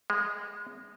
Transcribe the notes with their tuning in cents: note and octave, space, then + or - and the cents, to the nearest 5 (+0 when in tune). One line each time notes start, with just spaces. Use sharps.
G#3 -20